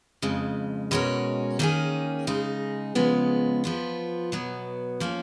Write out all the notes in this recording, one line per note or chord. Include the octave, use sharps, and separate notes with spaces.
F2 C#3 G#3
B2 G#3 C#4 F#4 A#4
D#3 A#3 C#4 G#4
C#3 G#3 D#4 G#4
C#3 F3 G#3 B3
F3 B3 F4
B2 F#3 B3
F3 A#3 C#4